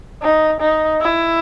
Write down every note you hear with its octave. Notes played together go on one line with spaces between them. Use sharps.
D#4
D#4
E4